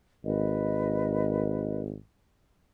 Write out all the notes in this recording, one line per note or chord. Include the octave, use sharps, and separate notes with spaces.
G#1 A#4 B4 D#5